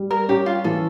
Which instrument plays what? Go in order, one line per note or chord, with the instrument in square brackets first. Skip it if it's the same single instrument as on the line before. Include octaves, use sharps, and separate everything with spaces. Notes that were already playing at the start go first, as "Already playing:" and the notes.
Already playing: [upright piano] G3
[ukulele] A#4
[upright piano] C#4 [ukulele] G4
[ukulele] F4
[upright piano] E3 [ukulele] A4